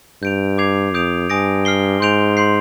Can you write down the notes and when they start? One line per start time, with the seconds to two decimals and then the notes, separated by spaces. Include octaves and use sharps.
0.22 G2 G6 D7 F7
0.58 D6 G#6 C7 F7
0.94 F2 D#6 G6 D7 F7
1.29 G2 G#5 D#6 A#6 D7
1.65 F6 C7 G7
2.00 G#2 C6 G6 D7 F7
2.37 C6 G6 C7